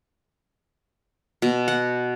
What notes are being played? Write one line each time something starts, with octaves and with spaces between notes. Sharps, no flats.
B2
F#5